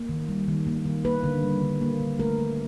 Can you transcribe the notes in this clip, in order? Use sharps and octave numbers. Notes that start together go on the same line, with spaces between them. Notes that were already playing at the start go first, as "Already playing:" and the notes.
Already playing: A#3
D#3
G3
D#3
A#3
D#3
A#3 B4
D3
G3
D3
A#3
D3
A3 A#4
D3